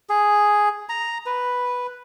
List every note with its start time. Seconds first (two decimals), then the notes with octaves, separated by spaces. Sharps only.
0.09 G#4
0.89 A#5
1.26 B4